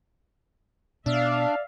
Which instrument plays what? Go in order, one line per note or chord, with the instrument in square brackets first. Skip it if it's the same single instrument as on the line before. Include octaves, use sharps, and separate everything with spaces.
[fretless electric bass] B2 [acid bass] D4 [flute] D5 [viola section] E5 F5